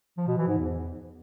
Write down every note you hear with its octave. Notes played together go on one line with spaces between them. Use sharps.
F3
B2
E3
G#2
E2